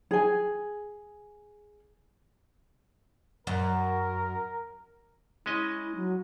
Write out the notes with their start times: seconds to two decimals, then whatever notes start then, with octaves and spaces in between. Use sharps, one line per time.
0.11 G#4 G#5
3.47 F#2 A#4
5.46 G#3 C#4 E4 D#5
5.96 F#3